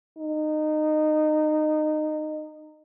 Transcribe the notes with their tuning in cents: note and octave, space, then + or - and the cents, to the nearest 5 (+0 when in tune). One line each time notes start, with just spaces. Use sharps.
D#4 -20